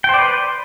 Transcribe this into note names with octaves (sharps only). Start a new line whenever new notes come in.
B4 C5 D5 G5